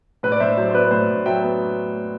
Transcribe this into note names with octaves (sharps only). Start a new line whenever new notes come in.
A2 B4
D5
A2 C5 E5
F#3 C5
C5
B3 B4 D5
A2 C5
A2
F#3 E5 G5
B3